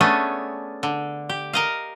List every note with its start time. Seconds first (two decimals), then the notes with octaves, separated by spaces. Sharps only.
0.01 A3 B3 C#4 D4 G#4
0.83 D3
1.29 G4
1.53 A#4 D#5 F5